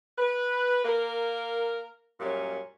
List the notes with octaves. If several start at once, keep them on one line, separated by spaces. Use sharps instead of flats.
B4
A#3 A#4
F#2 A#2 G3 C#4